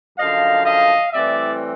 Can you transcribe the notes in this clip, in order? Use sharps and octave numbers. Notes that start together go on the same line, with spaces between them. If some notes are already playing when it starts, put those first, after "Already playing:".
F#2 D3 F3 D#5 F5
D#5 F5
A2 E3 G3 C4 D5 E5